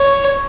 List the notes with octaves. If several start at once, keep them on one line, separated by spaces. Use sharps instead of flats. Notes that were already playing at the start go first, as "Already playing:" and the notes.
Already playing: C#5